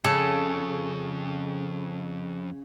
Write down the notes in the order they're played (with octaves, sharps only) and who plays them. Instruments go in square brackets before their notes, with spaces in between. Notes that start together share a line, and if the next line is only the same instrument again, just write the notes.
[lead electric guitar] F2 [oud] C#3 [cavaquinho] A4